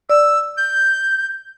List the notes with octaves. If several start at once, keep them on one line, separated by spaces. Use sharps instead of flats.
D5 E6
G6